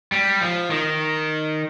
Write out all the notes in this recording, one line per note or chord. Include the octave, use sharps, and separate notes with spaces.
G3
F3
D#3